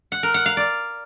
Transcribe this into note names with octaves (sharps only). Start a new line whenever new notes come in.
F#5
A#4
F#5
F5
D5